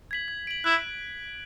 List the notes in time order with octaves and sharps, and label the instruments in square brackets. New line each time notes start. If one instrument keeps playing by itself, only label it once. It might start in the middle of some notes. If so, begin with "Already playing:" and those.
[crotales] G#6 B6 F#7
G#6
D7 F#7
[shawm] E4 [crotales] F#6